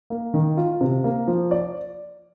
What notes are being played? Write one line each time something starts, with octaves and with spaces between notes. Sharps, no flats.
A#3
D#3
F4
C3
A#3
F3
D5